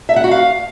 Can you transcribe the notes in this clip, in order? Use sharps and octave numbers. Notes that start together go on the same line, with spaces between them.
E5
F#5
F#4
F5